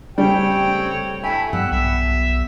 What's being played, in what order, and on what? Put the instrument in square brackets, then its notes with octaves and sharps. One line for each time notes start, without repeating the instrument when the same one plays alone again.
[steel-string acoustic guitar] C#3 A3 A4 [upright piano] G3 [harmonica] C4 C#5 G5
[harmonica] A3 E4 [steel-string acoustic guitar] E5 G#5 [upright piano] G5
[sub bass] G2 [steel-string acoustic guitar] F#3 G3 B3 [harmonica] F#5 E6
[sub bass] B1 [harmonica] E5